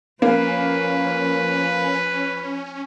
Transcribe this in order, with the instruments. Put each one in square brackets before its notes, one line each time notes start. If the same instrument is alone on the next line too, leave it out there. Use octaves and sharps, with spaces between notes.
[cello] F3 [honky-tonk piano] A#3 [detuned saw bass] C#4 [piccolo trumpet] B4